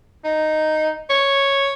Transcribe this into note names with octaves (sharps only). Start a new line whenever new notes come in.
D#4
C#5